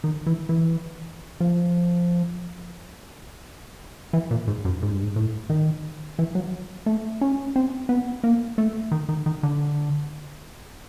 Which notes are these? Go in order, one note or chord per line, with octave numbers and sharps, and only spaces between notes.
D#3
E3
E3
F3
E3
A#2
G#2
F#2
G#2
G2
G#2
A2
D#3
E3
F#3
A3
C#4
C4
B3
A#3
A3
D#3
D#3
D#3
D3